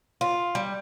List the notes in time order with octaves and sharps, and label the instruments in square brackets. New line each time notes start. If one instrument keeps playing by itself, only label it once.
[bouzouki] F4
G3